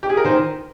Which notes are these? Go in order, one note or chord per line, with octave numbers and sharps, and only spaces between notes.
G4
G#4
A#4
D#3 C5